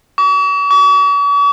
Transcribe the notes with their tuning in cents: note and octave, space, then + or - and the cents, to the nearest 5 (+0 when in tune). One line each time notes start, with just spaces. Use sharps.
C#6 +45
C#6 +45